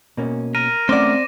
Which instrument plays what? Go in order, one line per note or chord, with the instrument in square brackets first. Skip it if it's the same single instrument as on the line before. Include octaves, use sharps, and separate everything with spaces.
[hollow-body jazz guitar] B2 A#3 C#4
[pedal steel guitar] A#4 [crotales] D#7
[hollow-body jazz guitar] A3 C#4 F#5 [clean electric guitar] C4 D5 [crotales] D6 A#6